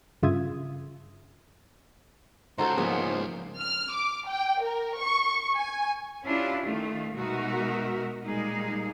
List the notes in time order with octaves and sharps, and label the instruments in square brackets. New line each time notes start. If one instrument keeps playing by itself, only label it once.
[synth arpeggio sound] G2 C#3 F4 E5 D#6 G#6
[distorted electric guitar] C#2 [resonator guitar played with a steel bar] D#4 F#4 A4 [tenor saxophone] C5
[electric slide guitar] G#2 F3 A#3 [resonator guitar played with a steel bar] B3 G#4
[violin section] F6
D6
G5
A#4
C#6
G#5
[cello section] C#4 D4 E4 F4 G4
D#3 A3 F4
B2 G#3 D#4 F#4 A#4 E5
A#2 G3 G#3 A#3 D#4 G#4